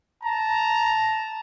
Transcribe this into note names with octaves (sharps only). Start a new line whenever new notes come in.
A5 A#5